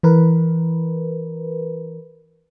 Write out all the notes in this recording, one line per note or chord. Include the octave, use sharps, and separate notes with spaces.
E3 A#4 B4